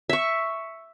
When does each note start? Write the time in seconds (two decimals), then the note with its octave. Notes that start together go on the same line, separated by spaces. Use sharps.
0.09 E5 C#6